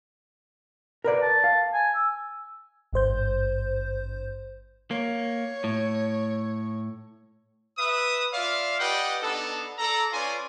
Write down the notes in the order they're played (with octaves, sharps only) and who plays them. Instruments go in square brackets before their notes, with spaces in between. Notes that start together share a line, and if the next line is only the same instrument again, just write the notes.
[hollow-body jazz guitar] A#4 B4 D5
[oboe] A5
[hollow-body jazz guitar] F5
[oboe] G#5
E6
[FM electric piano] G#1 G2 C5 G6
[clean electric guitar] A#3 [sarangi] C#5
[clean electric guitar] A2
[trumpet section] B4 E5 D#6
F4 D5 E5 F5
G4 B4 D5 D#5 F#5 G5
B3 D4 D#4 A4
A4 D5 A#5
C#4 F4 B4 D5 G#5 C6